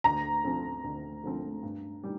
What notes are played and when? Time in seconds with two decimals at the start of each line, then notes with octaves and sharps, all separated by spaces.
0.04 D2 A#5
0.44 D3 F3 C4
0.84 D2
1.24 D3 F3 C4
1.63 G2
2.03 D#3 G3